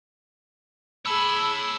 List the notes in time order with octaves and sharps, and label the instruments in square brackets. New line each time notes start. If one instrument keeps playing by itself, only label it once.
[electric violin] G#4 B5 [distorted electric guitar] C#5 A5 [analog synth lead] E6